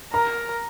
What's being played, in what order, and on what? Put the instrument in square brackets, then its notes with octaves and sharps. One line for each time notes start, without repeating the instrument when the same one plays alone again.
[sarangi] A#4 [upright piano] A#5